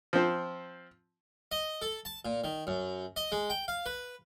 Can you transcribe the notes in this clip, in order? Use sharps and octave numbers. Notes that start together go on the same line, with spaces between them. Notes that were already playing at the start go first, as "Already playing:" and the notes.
F3 C4
D#5
A4
A5
A#2
D#3
F#2
D#5
G#3
G5
F5
B4